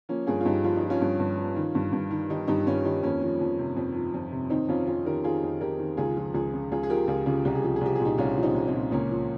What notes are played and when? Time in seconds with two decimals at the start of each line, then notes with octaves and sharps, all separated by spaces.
0.09 F3 A#3 C#4
0.27 G2 F4 G#4
0.41 F4
0.45 G2 D#4 G4
0.64 F3 F4
0.77 D#4
0.83 F3
0.90 C#4 F4
1.01 G2
1.20 G2
1.38 F3
1.56 D#3
1.75 G2
1.93 G2
2.11 D#3
2.30 D#3 D#4 G4
2.48 G2 D#4 G4
2.67 G2 C#4 F4
2.85 D#3 D#4 G4
3.03 F2 A#3 C#4
3.21 F3
3.41 F2
3.59 C3
3.77 F2
3.95 F3
4.14 F2
4.32 C3
4.50 D#3 C4 D#4
4.69 F2 C#4 F4
4.87 F2 C#4 F4
5.05 D#3 G4 A#4
5.24 D#3 F4 G#4
5.43 F2
5.61 F2 G4 A#4
5.79 D#3
5.97 C#2 F4 G#4
6.17 F3
6.34 C#2 F4 G#4
6.53 C#3
6.71 C#2 F4 G#4
6.83 G#4
6.90 F3 G4 A#4
7.08 C#2 F4 G#4
7.26 C#3 F4 G#4
7.45 C2 G4
7.55 G#4
7.63 F3 G4
7.76 G#4
7.81 C2 G4
7.95 A#2 G#4
8.05 D#4 G4
8.18 C2 C#4 F4
8.37 F3
8.43 C4 D#4
8.55 C2
8.68 C4 D#4
8.73 A#2
8.92 C#2 A#3 C#4
9.10 F3